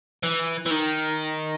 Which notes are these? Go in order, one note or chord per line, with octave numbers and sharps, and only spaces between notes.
E3
E3
D#3